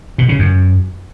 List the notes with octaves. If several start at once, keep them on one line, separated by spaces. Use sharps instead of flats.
B2
C#3
F#2